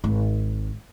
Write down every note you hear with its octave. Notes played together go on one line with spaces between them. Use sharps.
G#1